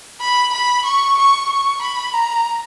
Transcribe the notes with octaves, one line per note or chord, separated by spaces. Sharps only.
B5
B5
C#6
C#6
C#6
B5
A#5